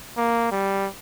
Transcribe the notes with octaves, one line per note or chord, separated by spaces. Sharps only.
A#3
G3